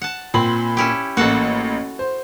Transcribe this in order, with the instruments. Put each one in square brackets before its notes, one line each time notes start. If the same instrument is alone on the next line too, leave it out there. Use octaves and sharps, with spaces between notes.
[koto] F#5 A5
[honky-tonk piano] A#2 B5 F#7 [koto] C4
[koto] C#4 E4 G4
[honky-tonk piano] A1 A#3 [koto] F#4 A4 A5
[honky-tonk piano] C5